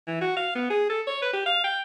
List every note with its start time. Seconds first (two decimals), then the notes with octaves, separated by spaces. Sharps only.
0.07 E3
0.22 F#4
0.36 F5
0.55 B3
0.70 G#4
0.90 A4
1.07 C#5
1.22 B4
1.33 G4
1.46 F5
1.64 G5